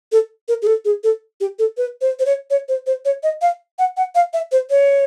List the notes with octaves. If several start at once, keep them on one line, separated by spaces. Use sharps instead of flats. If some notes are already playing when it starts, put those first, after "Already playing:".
A4
A#4
G#4
A4
G#4
A4
G4
A4
B4
C5
C5
C#5
C#5
C5
C5
C#5
D#5
F5
F#5
F#5
F5
E5
C5
C#5